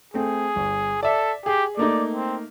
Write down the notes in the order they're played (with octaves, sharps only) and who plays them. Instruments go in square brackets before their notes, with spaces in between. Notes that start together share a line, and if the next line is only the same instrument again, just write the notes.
[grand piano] A3 C4 [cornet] G#4
[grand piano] G1
[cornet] A4 [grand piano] D5 E5
[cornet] G4 [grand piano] G#4
[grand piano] A3 A#3 D#4 [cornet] D5
[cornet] C4